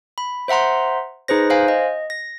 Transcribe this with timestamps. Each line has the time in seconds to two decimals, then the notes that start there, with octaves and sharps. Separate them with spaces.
0.18 B5
0.48 C5 E5 F#5 A#5 C6
1.28 D#4 G#4 B4 C5 A#6
1.50 C5 F5 G#5
1.68 D#5
2.10 A#6